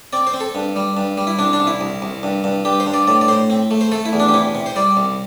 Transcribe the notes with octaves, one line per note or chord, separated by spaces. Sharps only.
C4 D5
C5
C4
A4
G2
G3
G2
G3
E4
C2 D4
D4
C2
E4
C2
C2
G2
G2
G2 G4
C5
G2
D5
A2 D5
D5
A2 C5
C4
A3
C5
A3 A4
E4
E2
D4
G4
C3 E4
C3
C5
G3 D5
C2